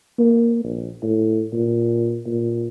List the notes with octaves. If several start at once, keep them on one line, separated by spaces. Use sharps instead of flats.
A#3
A#1
A2
A#2
A#2